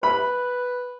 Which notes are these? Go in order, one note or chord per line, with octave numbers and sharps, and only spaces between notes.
B4 B5